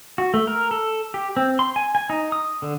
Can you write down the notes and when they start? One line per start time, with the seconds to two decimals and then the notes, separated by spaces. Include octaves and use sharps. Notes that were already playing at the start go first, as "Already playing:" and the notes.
0.18 F#4
0.34 A3
0.47 A#4
0.71 A4
1.14 G4
1.37 C4
1.59 C6
1.76 G#5
1.95 G#5
2.10 D#4
2.32 D#6
2.62 D3